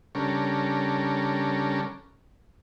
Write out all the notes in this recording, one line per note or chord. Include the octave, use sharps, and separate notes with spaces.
C#3 G3 C#4 D4 A4 A#4